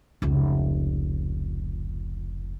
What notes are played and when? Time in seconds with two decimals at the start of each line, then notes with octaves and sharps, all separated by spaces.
0.22 F1 C#2